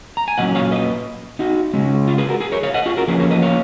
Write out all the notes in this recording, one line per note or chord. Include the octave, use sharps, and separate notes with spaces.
A#5
G#5
A#2 F#3 C#4 D#5 F#5
C#5 F5
B4 D#5
D#4 F#4
C#3 G#3 C#4
F4
G#4 B4
F#4 A#4
G#4 B4
A#4 C#5
C#5 F5
D#5 F#5
F4 G#4
F#4 A#4
F3 A#3 C#4 G#4 B4
A#4 C#5
B4 D#5
C#5 F5